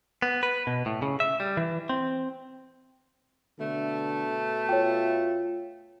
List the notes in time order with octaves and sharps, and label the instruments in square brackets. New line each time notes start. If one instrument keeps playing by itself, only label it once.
[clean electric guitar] B3
B4
B2
A2
C#3
E5
G3
E3
C4
[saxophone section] B2 A3 [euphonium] D3
[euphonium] F4 [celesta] C#5 G5